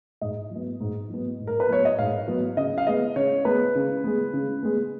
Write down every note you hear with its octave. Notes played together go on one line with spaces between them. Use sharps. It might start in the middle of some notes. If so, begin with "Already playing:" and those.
G#2 D#5
F#3 B3
G#2
F#3 B3
G#2
A#4
B4
F#3 B3 C#5
D#5
G#2 F5
F#3 B3
C#3 D#5
F5
G#3 B3 D#5
C#3 C#5
G#3 B3 B4
C#3
G#3 B3
C#3
G#3 B3